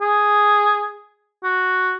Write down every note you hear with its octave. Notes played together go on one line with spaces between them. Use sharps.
G#4
F#4